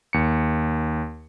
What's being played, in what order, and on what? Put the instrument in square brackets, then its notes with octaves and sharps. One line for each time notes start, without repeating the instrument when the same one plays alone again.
[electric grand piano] D#2 C#7